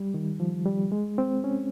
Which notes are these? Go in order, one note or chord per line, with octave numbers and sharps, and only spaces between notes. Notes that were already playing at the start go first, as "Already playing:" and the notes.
Already playing: G3
D#3
F3
G3
G#3
C4
C#4